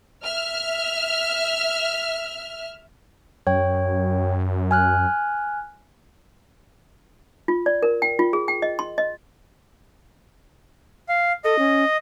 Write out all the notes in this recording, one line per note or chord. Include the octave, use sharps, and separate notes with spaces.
E5 F6
F#2 C#5 G5
G#5 F6 F#6
F4
D5
A#4
G5
F4
G#4
G5
D#5
C6
D#5
F5
A4 D#5
C#4